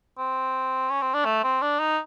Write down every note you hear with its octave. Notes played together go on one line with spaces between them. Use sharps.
C4
C#4
C4
D4
A3
C4
D4
D#4